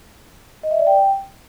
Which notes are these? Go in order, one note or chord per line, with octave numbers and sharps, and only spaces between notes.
D#5
E5
D5
G5